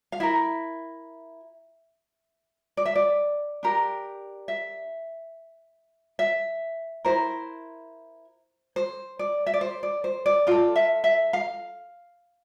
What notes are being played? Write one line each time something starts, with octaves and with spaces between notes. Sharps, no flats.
F5
E4 A#4 E5
D5
E5
D5
D4 G4 A#4
E5
E5
E4 A#4 C5
C5
D5
E5
D5
C5
D5
C5
D5
F4 A4 D5
E5
E5
F5